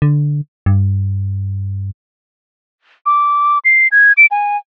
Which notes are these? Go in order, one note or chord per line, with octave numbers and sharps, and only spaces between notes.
D3
G2
D6
C7
G#6
D7
G#5